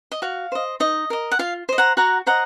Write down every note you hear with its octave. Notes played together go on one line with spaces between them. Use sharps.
D#5
F#4 F5
C5 D#5
D#4 D#5
A#4 D#5
F#5
F4 F5
C5 D#5
F#5 A#5
F#4 F#5 A#5
C5 D#5 F#5 A#5